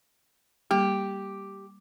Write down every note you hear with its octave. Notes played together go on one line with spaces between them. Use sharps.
G3 A#3 G4